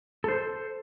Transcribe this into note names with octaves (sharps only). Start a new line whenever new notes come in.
A4 C5